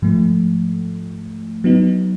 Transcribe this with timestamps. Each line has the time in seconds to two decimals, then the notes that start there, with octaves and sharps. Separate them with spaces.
0.02 G#2 F3 A3
1.64 F#3 B3 D#4